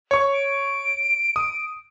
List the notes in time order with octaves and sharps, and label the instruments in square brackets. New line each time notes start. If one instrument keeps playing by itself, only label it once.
[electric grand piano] C#5 C#6
[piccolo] D7
[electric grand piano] D#6